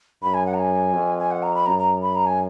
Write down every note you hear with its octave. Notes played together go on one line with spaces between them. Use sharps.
F#2 B5
G#5
F#5
A#5
G#5
F2
G#5
F#5
A#5
B5
F#2 A#5
A#5
B5
A#5
G#5